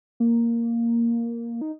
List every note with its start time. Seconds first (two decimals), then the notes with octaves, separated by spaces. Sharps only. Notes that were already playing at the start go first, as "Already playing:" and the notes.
0.20 A#3
1.61 D#4